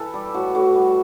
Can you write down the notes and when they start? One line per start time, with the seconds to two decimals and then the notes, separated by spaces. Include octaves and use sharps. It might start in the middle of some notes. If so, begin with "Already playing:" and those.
Already playing: E3 A4 B4
0.14 G3 G4
0.34 A2 F#4
0.55 A2 F#4
0.75 G3